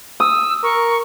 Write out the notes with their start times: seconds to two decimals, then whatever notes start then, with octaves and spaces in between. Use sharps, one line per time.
0.20 D#6 E6
0.63 A#4 C#6